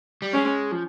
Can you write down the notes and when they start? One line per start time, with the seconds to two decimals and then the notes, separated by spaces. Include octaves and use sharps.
0.22 G3
0.33 G#3 C#4
0.72 F3